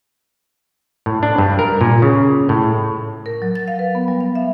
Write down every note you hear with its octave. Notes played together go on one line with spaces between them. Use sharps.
A2
D4
G2
A#4
A#2
C#3
A2
A#4
F#3
A6
F5
B4
B3
G3
F5
E5